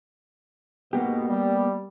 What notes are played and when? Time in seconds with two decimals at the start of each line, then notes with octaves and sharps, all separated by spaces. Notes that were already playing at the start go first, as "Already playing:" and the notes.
0.93 G#2 B2 A#3 B3 G4
1.28 G3